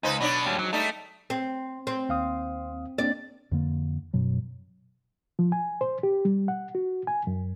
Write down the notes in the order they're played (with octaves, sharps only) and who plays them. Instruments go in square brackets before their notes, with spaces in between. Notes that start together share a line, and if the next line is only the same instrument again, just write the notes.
[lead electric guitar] C#2 [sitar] D#4 B4 C5
[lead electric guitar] B2 [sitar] F#3 D4 C#5
[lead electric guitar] D#2 G3
[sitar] G#2 [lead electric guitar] F#3
[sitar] G3 D#4 [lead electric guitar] A3
[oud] C4
C4
[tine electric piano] D#2 F5 D#6
[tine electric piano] A#3 C4 D4 [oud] D5
[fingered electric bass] F2 D3 A#3
F#2 B2 F#3
[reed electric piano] F3
G#5
C5
G4
G3
F#5
F#4
G#5
F#2